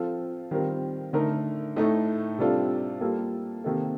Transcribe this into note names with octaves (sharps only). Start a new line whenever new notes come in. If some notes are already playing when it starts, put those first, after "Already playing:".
Already playing: F3 C4 F4 A4
D#3 G3 C4 F4 A#4
D3 A3 D#4 A#4
A2 A3 D#4 A4
C3 G3 D4 F4 A4
G3 A#3 F4 A4
C3 D#3 A#3 D#4 A4